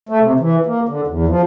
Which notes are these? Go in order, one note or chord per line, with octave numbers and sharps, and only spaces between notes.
A3
C3
E3
A#3
D3
E2
F3